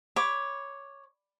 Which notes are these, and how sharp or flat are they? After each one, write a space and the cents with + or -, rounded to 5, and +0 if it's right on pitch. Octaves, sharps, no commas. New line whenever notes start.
C#5 +0 B5 +0 D6 +0